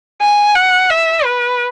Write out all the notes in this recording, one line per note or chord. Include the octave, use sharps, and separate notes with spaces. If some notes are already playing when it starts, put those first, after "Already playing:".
G#5
F#5
E5
B4